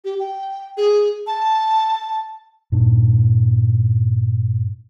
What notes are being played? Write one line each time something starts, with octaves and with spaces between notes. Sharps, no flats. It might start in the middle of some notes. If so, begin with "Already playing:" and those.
G4
G5
G#4
A5
G2 A#2 D4